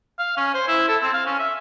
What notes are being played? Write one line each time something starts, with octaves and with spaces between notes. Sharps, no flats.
F5
C#4
C5
E4
A4
C4
F5
C#4
E5